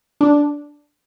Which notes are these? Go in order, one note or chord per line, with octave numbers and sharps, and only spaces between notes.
D4